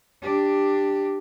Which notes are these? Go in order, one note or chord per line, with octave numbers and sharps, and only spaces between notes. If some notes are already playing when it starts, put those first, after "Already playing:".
D4 G4